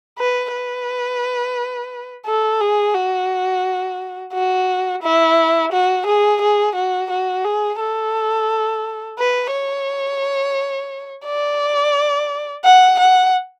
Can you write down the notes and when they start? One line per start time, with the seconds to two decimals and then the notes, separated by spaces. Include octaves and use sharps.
0.19 B4
0.53 B4
2.26 A4
2.61 G#4
2.95 F#4
4.33 F#4
5.03 E4
5.72 F#4
6.06 G#4
6.41 G#4
6.75 F#4
7.11 F#4
7.45 G#4
7.80 A4
9.19 B4
9.53 C#5
11.26 D5
12.65 F#5
13.00 F#5